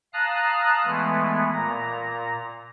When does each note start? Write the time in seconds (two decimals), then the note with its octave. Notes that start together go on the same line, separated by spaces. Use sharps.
0.13 F5 A5 A#5 D#6 F6 F#6
0.85 E3 G#3 A3 B3
1.53 A#2 A#5